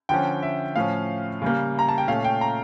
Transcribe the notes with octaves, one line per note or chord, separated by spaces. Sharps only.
D3 F3 C#4 G5
E5
A2 F3 C#4 F5
C#3 G3 A#3
A#5
A5
G5
A#2 A3 C#4 F5
G5
A#5